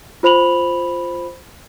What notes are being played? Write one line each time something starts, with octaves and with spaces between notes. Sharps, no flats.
F4 C5 B5 F7 F#7